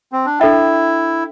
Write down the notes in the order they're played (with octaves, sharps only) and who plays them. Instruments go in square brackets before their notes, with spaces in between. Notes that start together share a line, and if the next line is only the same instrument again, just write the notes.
[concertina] C4
D4
[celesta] D4 A4 E5 G5 [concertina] E4